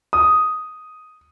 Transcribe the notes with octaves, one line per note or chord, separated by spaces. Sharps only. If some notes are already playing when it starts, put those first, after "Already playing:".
D#6